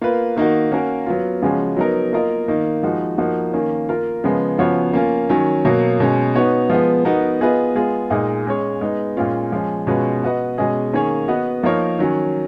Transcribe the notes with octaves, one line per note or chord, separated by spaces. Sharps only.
A#3 F4 B4
D#3 A#3 D#4 F#4
A#3 C#4 F#4 A#4
F#3 B3 F4
C#3 F3 G#3 C#4 F#4
F#3 B3 D#4 A#4
A#3 F4 A#4 D#5
D#3 A#3 D#4
F3 G#3 D#4 F#4
F3 A#3 D#4 F#4
D#3 A#3 C#4
A#3 F4 A#4
C#3 F3 G#3 B3
C#3 F3 B3 F#4 C#5
A#3 C#4 F4
D#3 F#3 C#4
B2 F#3 A#3
B2 G#3 C#4
B3 D#4 F#4 C#5
F3 G#3 B3
B3 D#4 F#4 A#4
B3 F4 G#4 B4 D#5
G#3 B3 F4 G#4
A#2 G#3 D#4 G#4 D#5
G#3 C#4 G#4 C#5
G#3 B3 D#4
A#2 G#3 C#4 F4
F3 G#3 C#4
B2 G#3 C#4 F4 B4
B3 F#4 B4 D#5
B2 G#3 C#4 G#4 D#5
D#3 A#3 C#4 G#4 C#5
B3 F#4 B4 D#5
F3 A#3 D#4 A#4 C#5
D#3 F#3 C#4